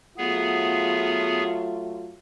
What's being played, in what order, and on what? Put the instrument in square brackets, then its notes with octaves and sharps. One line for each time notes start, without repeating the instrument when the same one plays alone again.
[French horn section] F#3 A3 F4 [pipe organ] B3 G#4